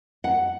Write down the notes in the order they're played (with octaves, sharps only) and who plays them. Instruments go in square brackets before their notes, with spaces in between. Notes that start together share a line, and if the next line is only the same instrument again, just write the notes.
[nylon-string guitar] F#5